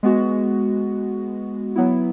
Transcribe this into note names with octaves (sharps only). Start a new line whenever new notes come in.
G#3 B3 F#4
F#3 B3 E4